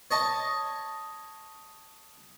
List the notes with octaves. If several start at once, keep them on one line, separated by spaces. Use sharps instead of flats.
C#5 D#5 A5